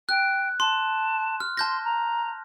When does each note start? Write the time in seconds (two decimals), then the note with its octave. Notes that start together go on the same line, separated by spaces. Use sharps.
0.09 G5 F#6
0.60 A5 C6
1.40 F6
1.57 A5 C6 G6 A#6
1.84 A#5